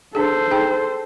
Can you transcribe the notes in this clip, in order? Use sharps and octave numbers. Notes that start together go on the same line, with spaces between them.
D4 G#4 A4 C5
D#4 G#4 G5